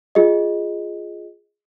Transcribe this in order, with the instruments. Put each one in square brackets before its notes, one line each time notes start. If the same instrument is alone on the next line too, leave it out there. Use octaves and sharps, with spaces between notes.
[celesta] F4 G#4 D#5